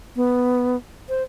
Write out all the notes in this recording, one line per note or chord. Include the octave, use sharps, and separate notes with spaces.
B3
C5